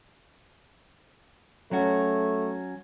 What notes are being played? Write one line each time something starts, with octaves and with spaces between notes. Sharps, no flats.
F#3 A3 C#4 F#4